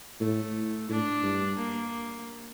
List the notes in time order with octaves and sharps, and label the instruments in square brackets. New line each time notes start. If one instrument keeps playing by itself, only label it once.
[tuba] A2 [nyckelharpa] A3
[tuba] A2 [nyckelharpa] D4
[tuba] G2
[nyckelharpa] A#3